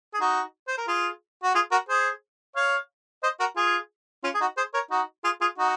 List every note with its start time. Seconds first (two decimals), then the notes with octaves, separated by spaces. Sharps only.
0.14 G#4
0.21 D#4 F#4
0.68 C5
0.78 A#4
0.88 F4 G#4
1.43 F#4
1.55 F4 G#4
1.72 F#4 A#4
1.89 G#4 C5
2.56 C#5 F5
3.23 C5 D#5
3.40 F#4 A#4
3.56 F4 G#4
4.24 C#4 F4
4.34 G#4
4.41 D#4 F#4
4.57 G#4 C5
4.74 A#4 C#5
4.91 D#4 F#4
5.24 F4 G#4
5.41 F4 G#4
5.58 D#4 F#4